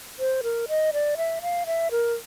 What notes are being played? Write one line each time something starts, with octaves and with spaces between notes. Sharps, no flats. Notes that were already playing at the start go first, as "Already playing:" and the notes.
C5
A#4
D#5
D5
E5
F5
E5
A#4